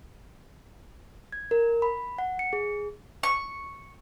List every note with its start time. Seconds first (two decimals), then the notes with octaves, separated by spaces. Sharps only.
1.32 G#6
1.51 A#4
1.82 B5
2.18 F#5
2.39 C#7
2.53 G#4
3.23 C#6